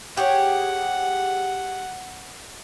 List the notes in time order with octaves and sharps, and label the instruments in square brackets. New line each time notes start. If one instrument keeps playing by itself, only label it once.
[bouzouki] G4 G#4 C#5 [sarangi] F#5